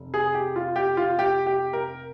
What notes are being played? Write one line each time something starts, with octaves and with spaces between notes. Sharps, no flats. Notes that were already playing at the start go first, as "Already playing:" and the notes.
Already playing: F1
G#4
G4
F4
G4
F4
G4
G4
A#4